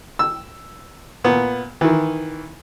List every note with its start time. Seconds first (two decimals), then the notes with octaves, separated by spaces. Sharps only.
0.19 E6
1.24 A#2 B3
1.81 D#3 E3